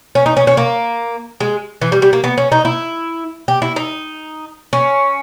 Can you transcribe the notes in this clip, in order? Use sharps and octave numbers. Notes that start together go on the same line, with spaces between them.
C#4
D#4
C#4
C#4
A#3
G#3
E3
G3
G3
A#3
B3
C#4
D#4
E4
G4
E4
D#4
C#4